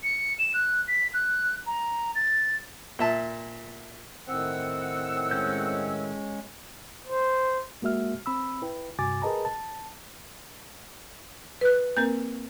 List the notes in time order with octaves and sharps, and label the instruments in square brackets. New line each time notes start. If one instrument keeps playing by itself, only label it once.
[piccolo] C#7
E7
F#6
B6
F#6
A#5
A6
[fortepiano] A#2 E5 A5
[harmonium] A2 D#3 [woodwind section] C4 F#5 E6
[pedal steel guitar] G#3 C#4 G6
[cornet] C5
[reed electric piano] G#3 A#3 F#4 E5 F6
C4 B5 E6
E4 B4 G5
G2 C3 F#4 G#5 D6 A6
G#4 A#4 B4 D#5 A5 A#5
A5
[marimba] B4 F#6
[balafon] A#3 C4 A#4 [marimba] G6